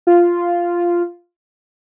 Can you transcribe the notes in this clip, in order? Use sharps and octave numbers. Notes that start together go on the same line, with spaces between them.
F4